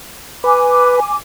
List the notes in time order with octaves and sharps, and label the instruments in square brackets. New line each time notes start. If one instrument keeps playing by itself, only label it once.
[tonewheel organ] B4 [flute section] G#5 D6